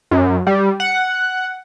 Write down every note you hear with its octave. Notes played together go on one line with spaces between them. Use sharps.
F#2
G3
F#5